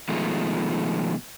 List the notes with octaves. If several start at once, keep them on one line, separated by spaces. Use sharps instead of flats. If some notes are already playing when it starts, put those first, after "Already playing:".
B2 D#3 F3 G#3 A3